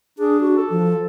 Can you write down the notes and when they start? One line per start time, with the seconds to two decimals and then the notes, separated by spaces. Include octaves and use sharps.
0.19 D4 G#4
0.41 F#4
0.57 A4
0.70 F3